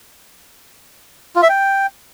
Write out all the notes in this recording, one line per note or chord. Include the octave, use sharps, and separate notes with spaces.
F4
E5
G5